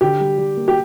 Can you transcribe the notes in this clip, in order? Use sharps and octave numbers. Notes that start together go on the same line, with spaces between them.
D3 G4
G3
G3
A#3
G4